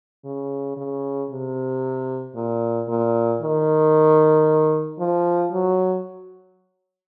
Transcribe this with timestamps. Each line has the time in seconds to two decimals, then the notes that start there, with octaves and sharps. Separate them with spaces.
0.25 C#3
0.77 C#3
1.31 C3
2.35 A#2
2.88 A#2
3.41 D#3
4.99 F3
5.52 F#3